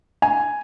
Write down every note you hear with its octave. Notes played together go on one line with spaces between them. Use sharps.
G#5